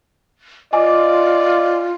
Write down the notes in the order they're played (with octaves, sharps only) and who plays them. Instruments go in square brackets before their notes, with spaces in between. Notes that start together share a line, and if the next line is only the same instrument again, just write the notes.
[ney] F4 [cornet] D5 [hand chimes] D#5 G#5 D6